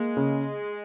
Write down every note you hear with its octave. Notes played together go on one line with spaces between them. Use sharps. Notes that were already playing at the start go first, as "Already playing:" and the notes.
Already playing: G#3 A#3
C#3